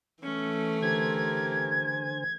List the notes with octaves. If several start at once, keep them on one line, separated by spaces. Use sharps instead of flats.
E3 A3 C#4 C#6
D3 G4 A#4 C5 G#5 G#6